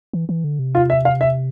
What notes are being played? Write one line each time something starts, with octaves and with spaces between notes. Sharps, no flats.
E3
E3
D3
C3
F4
E5
F5
E5